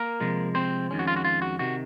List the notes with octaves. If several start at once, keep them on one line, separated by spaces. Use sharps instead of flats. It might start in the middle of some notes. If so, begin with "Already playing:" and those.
Already playing: A#3 A#4
C3 F3 G#3
C4 C5
F2 D#3 G#3 C#4
F#4
F4
F#4
F4
F#4
C3 D#3 F#4